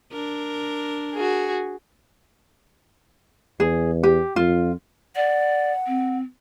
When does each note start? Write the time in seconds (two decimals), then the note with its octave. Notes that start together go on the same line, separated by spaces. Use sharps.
0.12 D4 A#4
1.14 F#4 G#4
3.60 E2 G#4
4.03 G4
4.36 F2 F4
5.16 D5 F#5
5.87 C4